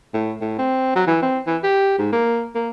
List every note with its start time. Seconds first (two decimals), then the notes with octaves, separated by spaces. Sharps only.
0.14 A2
0.41 A2
0.58 C4
0.96 F#3
1.07 E3
1.22 C4
1.47 E3
1.63 G4
1.98 G#2
2.12 A#3
2.55 A#3